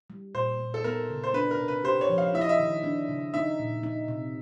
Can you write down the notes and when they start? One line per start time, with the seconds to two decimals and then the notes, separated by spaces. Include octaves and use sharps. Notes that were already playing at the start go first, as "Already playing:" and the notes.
0.10 G3
0.35 A#2 C5
0.60 A#2
0.74 A4
0.84 B3 A#4
1.10 C#3
1.24 C5
1.34 D4 B4
1.51 A#4
1.59 C3
1.68 B4
1.84 G4 C5
2.01 C#5
2.09 F3
2.18 F5
2.34 E4 E5
2.41 D#5
2.49 E5
2.60 D#3
2.84 D4
3.09 C#3
3.34 D#4 E5
3.59 A#2
3.83 D#4
4.08 C3